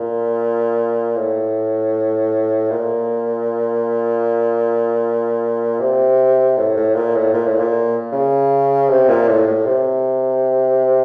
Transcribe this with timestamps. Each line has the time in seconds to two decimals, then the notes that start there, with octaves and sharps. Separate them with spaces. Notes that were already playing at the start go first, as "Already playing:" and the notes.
Already playing: A#2
1.16 A2
2.71 A#2
5.80 C3
6.57 A2
6.76 A2
6.95 A#2
7.16 A2
7.34 A#2
7.47 A2
7.59 A#2
8.12 C#3
8.89 C3
9.09 A#2
9.28 A2
9.47 A2
9.66 C3